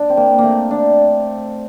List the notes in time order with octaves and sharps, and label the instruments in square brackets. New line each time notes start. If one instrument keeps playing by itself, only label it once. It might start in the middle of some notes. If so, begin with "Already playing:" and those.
Already playing: [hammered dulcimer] D4
C4
A#3
A#3
A3
D4